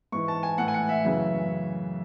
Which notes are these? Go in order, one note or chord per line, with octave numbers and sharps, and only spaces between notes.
G#2 E3 C#6
A5
G#5
A2 E3 F#5
G#5
F#5
E5
F#2 C#3 E3